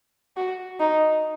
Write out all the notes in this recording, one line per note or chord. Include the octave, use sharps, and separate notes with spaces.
F#4
D#4